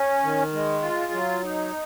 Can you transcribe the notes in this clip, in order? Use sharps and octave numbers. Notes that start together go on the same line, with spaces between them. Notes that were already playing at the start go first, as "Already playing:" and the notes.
Already playing: C#4
D#3
G#3
F4
F#3
D#4